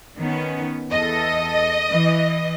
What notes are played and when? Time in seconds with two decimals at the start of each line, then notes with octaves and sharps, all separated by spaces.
0.17 D#3 B3 C#4
0.91 E2 A4 D#5
1.90 E3